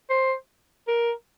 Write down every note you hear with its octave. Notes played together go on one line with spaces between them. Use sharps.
C5
A#4